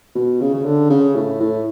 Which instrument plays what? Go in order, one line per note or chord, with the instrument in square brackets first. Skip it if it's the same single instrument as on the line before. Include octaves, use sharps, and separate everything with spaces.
[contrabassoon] B2
C#3
C#3
D3
C#3
A2
A2